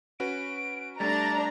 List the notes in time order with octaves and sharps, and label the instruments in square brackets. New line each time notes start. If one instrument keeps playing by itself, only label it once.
[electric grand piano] C#4 F#4 B4 [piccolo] D7
[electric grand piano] G3 A3 [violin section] D4 A#5 [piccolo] A6